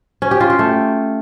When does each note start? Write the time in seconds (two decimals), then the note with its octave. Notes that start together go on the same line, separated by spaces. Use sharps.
0.22 C#4
0.31 G4
0.40 F4
0.50 G4
0.59 A3